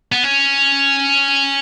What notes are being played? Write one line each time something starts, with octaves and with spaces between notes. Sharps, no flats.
B3
C#4